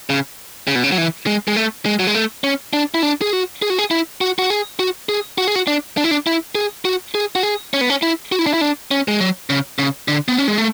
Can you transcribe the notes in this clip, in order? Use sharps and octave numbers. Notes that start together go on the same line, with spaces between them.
C#3
C#3
B2
C#3
F#3
E3
G#3
G#3
A3
G#3
F#3
G#3
A3
C#4
D4
E4
D4
G#4
F#4
G#4
F#4
G#4
E4
F#4
F#4
G#4
F#4
G#4
F#4
G#4
F#4
D4
D4
E4
D4
E4
G#4
F#4
G#4
F#4
G#4
C#4
B3
C#4
E4
F#4
E4
D4
E4
D4
C#4
G#3
F#3
C#3
C#3
D3
B3
C#4
G#3
A3